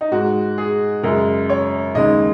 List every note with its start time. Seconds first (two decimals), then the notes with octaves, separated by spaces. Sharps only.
0.01 D#4
0.11 G#2 G#3 F#4
0.58 G#4
1.03 F#2 C#3 G#3 A#4
1.50 C#5
1.95 D#2 C#3 G#3 D#5